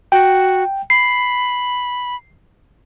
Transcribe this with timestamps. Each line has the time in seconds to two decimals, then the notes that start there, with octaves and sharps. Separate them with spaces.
0.12 F#4 G5
0.90 B5 C7